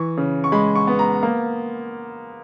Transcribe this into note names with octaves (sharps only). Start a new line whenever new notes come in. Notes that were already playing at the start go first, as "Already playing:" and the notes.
Already playing: E3 C#6
C#3
C#6
G#3 B5
C#6
B3
A#5
A#3